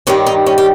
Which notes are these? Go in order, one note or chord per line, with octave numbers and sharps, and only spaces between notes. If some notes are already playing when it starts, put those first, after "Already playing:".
G2 D#3 G3 C#4
D#4
C#4
G4